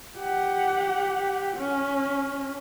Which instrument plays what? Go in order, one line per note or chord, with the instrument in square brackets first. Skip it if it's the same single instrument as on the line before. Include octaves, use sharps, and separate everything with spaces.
[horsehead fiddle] G4 F#5
C#4